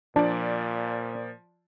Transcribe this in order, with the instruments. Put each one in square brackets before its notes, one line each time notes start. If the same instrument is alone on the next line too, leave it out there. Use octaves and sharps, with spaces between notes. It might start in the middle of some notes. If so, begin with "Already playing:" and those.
[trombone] A#2 [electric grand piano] F3 D5 [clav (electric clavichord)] D4